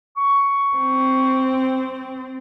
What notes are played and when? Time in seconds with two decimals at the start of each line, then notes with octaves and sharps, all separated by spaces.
0.17 C#6
0.76 C4